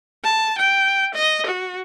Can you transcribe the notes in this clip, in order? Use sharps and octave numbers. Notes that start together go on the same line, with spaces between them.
A5
G5
D#5
F#4